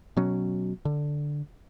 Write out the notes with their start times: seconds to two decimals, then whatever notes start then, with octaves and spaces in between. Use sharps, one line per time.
0.17 B2 F#3 C#4
0.85 D3